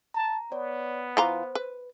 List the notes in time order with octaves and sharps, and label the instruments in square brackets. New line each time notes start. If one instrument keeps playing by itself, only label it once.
[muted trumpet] A5 [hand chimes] A#5
[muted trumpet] B3 [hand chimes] C#5 D5
[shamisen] E3 F4 A#5 [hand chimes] C5
[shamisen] B4